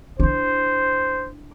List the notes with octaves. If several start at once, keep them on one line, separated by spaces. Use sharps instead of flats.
D4 E4 C5